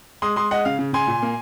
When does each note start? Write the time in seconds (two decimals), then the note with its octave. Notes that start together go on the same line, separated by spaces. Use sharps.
0.22 G#3 C6 D#6
0.36 G#3 C6 D#6
0.51 G#3 D#5 F#5
0.65 C#3 F5
0.79 C#3
0.93 C#3 G#5 C6
1.07 A#2
1.23 A#3